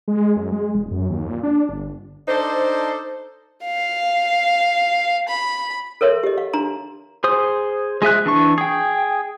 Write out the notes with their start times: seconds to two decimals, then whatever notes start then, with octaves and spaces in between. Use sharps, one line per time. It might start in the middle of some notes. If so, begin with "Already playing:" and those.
0.08 G#3
0.36 F#2
0.52 G#3
0.75 E1
0.91 F#2
1.10 D#2
1.29 A#2
1.43 D4
1.69 G1
2.28 D4 D#4 A4 C5
3.65 F5
5.29 B5
6.01 A4 A#4 C#5 E5 C6
6.23 G4 D#5
6.38 F5
6.53 D4 A#5 C6
7.24 G#4 C5 D#6
8.02 G#3 G#4 E5 F#6
8.26 E3 D4 C#6
8.58 G#4 G5